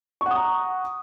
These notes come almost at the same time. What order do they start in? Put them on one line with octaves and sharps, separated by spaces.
C#6 F#5 D#6 A#5